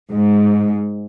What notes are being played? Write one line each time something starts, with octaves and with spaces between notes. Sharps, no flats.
G#2